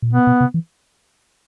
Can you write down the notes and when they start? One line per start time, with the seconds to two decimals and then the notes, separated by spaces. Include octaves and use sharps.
0.02 A#2
0.13 B2 B3
0.27 B2
0.41 C3
0.54 E3